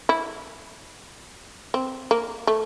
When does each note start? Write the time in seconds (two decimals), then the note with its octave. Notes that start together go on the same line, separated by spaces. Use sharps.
0.09 E4
1.74 C4
2.11 A#3
2.47 A3